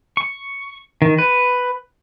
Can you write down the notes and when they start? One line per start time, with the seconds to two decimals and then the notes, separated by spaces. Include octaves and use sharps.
0.17 C#6
1.02 D#3
1.18 B4